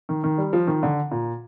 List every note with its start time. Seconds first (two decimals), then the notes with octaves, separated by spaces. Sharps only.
0.09 D#3
0.24 D#3
0.38 G3
0.53 F3
0.67 D#3
0.83 D3
1.11 A#2